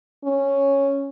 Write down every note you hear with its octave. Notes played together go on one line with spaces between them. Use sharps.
C#4